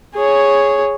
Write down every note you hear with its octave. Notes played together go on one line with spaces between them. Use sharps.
G#4 C#5